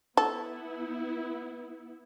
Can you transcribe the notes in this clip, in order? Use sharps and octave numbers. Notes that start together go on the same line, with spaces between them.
B3 E4 A4